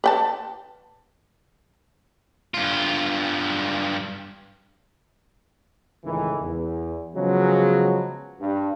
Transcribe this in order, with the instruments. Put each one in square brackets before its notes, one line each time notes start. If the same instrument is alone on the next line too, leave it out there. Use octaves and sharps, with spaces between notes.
[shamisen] B4 G5 A5
[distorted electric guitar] G2 F4
[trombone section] C#2 A2 D#3 E3
E2
C#3 F3 F#3 G#3 B3 C#4
G2